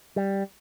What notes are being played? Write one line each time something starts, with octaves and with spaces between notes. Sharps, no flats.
G3